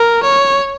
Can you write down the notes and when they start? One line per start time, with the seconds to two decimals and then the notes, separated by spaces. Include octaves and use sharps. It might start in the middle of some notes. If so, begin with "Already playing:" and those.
Already playing: A#4
0.23 C#5